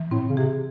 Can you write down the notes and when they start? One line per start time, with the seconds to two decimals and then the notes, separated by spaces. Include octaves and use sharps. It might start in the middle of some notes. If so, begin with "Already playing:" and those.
Already playing: E3
0.11 A2 C4
0.29 C#3
0.36 C3 G#4